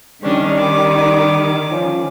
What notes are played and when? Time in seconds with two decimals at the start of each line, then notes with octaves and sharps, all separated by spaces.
0.24 D#3 G3 C#4 D4
0.59 D6
1.69 F3 C#4